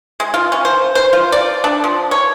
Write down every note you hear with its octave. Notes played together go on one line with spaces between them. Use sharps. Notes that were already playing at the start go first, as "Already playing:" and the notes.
G#3
F4
C#4
C5
C5
F4
D5
D4
F3
C#5